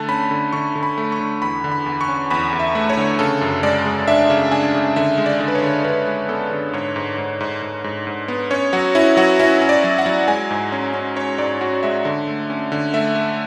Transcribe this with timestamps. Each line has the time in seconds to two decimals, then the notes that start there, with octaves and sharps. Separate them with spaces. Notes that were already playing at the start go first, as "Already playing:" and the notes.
Already playing: D3 A3 A5
0.09 C#4 B5
0.31 D3
0.53 D3 C#6
0.75 D3
0.83 B5
0.98 A3
1.12 C#6
1.20 D3
1.42 E2 B5
1.64 D3
1.72 B5
1.86 E2
2.01 C#6
2.08 C#4
2.31 E2 B5
2.53 E2
2.59 E5
2.75 A3
2.89 C#5
2.97 D3
3.19 C#3 A4
3.41 F#2
3.63 G#3 D5
3.86 G#3
4.08 D4 E5
4.30 C#3
4.51 D4 G#5
4.74 C#3
4.96 D3 E5
5.18 G#3
5.26 D5
5.40 D3
5.48 B4
5.55 C#5
5.63 D3
5.85 D3 B4
6.07 G#3
6.29 B3 A4
6.51 D3
6.73 G#2 C#5
6.96 G#2
7.18 G#2
7.40 G#2
7.62 G#2
7.84 G#2
8.07 G#2
8.28 B3
8.50 C#4 C#5
8.73 F#3 F#4
8.95 C#4 E4
9.17 F#3 F#4
9.39 C#4 E4
9.61 C#4
9.69 D5
9.84 F#3
9.99 F#5
10.06 F#3
10.28 G#3 G#5
10.51 G#2
10.72 C#4
10.94 C#4
11.16 C#4 C#5
11.38 G#2 D5
11.61 C#4 F#4
11.83 G#3 E5
12.05 D3
12.28 A3
12.50 C#4
12.72 D3
12.94 A3 E5
13.15 A3